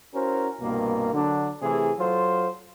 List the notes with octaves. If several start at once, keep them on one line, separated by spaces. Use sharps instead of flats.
C#4 E4 F#4 A#4 C5
C2 G2 B2 A#3
D3 F#3 D4
C3 E3 A3 G#4
F#3 F4 A4 C5